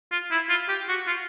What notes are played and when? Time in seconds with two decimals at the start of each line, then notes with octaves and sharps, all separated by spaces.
0.12 F4
0.31 E4
0.49 F4
0.69 G4
0.88 F#4
1.07 F4